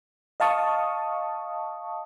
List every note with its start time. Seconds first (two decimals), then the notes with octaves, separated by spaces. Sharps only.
0.40 D#5 F5 A5 C#6 D#6